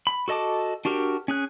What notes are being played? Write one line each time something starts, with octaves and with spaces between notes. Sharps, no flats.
B5
F#4 A4 D#5 A5 D6
D4 F#4 G4 A#4
C#4 G#4 F#6